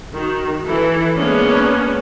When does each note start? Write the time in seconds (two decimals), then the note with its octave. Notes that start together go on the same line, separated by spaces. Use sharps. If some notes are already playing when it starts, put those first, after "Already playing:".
0.15 D#3 F#4
0.63 E3 E4 A4
1.16 G#3 A#3 B3 C#4 D4